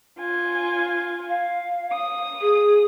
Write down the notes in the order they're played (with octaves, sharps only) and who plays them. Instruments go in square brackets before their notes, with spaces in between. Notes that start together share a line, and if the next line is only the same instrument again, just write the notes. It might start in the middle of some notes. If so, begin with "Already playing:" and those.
[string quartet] F4 G#5
[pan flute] F5
[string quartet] D#6
[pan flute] G#4